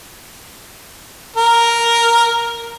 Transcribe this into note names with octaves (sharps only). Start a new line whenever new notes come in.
A#4